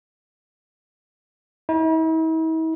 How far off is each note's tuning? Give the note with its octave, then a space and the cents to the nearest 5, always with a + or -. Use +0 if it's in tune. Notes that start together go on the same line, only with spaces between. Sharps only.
E4 -45